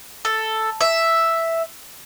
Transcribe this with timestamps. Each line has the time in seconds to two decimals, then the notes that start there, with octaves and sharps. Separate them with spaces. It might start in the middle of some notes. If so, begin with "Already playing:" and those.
0.25 A4
0.81 E5